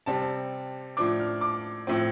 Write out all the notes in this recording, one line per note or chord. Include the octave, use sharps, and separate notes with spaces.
C3 G3 C4 A5
A2 F3 D4 D6
F6
D6
A2 F3 C4